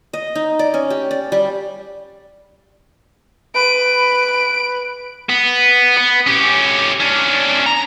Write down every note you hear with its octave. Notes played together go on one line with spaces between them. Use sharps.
D#5
D#4
D5
C#4
G4
D5
G3
B4 D7
B3
B3
C#4 G4
C#4 D4
A#5